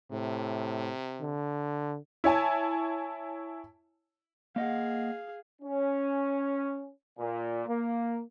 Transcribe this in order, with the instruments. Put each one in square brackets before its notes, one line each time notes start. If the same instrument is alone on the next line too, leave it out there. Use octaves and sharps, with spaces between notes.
[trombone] A2 [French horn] C3
[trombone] D3
[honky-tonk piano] E4 C#5 G#5 A5
[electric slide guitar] A#3 D#5 F#5 [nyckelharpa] G#4 F5
[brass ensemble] C#4
A#2
A#3